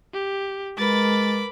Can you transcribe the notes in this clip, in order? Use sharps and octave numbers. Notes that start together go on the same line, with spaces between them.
G4
G#3 A#4 B4 B5 D6 A6